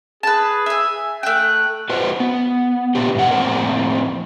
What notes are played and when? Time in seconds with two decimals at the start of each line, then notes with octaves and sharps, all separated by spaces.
0.23 G#4 B4 A5
0.66 E5 G#5
1.23 A3 G5 F#6
1.90 F#4 B4 C5
2.20 B3
2.95 A#2 D3 B3 G4
3.15 G2 B2 F#5
3.31 F2 A2 G#3 A#3 C4 A#4